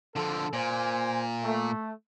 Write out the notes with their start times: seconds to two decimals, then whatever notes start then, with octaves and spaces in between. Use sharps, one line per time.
0.16 D3 F3 A4
0.53 A#2 C5 G#5
1.43 A3